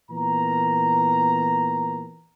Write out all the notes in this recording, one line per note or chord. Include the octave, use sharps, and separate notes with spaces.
A#2 E3 B3 A#4 A#5